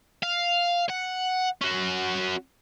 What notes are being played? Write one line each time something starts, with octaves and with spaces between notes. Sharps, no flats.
F5
F#5
C#4 F#4